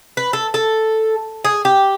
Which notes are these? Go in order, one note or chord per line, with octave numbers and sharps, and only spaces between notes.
B4
A4
A4
G#4
G4